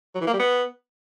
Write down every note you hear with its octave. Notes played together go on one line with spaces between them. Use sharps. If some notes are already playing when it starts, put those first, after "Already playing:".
F#3
E3
A#3
G3
B3